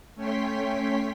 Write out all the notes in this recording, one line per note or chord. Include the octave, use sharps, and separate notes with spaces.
A3 C#4 C#5 G5 C6 B6